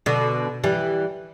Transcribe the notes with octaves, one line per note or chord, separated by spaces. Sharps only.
B2 D3
E3 G3